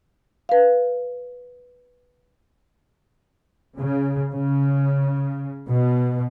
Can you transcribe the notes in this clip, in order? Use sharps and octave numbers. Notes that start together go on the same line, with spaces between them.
B4 F5
C#3
C#3
B2